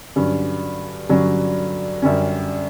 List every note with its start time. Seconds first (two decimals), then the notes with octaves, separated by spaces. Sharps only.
0.16 G2 D3 F#3 C#4
1.09 G2 D3 F#3 C#4
2.02 F#2 D3 G3 C#4